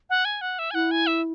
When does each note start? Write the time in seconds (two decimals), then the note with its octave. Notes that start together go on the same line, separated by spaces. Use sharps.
0.10 F#5
0.25 G#5
0.41 F#5
0.59 E5
0.71 G#5
0.74 E4 F#5
0.91 G#5
1.07 E5